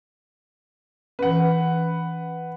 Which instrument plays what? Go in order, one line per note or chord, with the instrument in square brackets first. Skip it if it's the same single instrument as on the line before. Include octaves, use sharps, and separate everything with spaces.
[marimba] E3 C#4 [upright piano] B4 F#5